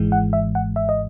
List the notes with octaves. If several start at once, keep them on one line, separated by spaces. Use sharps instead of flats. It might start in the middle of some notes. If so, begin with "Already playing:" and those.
Already playing: G#1 G#2 E3 G#3
F#5
E5
F#5
E5
D#5